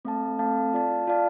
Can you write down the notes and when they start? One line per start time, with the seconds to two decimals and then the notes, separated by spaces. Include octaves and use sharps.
0.05 A3 C4 A4 F5 A5
0.39 A3 C4 A4 F5 A5
0.73 F4 D5 F5 A5
1.08 F4 D5 F5 A5